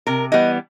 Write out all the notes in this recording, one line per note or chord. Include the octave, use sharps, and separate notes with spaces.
C3 A#4
E3 G3 B3 D#5